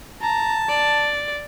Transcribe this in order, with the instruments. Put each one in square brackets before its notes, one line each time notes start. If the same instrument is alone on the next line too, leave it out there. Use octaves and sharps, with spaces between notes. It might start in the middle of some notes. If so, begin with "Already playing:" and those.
[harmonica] A5 [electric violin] A#5
[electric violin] D5